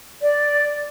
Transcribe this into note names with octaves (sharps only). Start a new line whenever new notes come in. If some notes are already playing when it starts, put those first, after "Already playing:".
D5